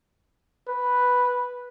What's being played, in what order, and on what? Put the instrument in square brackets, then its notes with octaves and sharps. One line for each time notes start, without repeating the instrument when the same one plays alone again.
[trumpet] B4